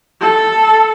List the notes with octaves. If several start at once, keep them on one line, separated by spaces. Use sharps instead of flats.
A4